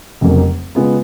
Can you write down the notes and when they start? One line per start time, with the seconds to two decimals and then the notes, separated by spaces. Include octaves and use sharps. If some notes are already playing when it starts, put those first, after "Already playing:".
0.21 F1 F2 C#3 F#3 A#3
0.75 C#3 G#3 B3 F4